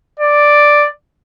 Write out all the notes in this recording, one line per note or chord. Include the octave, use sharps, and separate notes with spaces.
D5